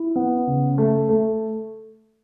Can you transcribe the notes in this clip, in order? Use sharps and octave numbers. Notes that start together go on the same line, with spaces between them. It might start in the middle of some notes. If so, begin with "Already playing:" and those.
Already playing: E4
B3
C#3
A3
A3